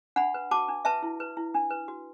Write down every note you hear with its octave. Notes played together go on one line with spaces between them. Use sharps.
D4 F#5 B5
B4
F#4 A5 D6
D4
B4 E5 A5
E4
B4
E4
D4
B4
F#4